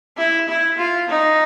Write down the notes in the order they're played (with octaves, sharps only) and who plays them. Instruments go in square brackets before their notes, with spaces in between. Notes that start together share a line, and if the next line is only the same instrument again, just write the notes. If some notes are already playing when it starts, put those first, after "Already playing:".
[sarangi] E4
E4
F4
D#4